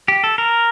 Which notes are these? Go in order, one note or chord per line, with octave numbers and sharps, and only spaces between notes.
G4
A4
A#4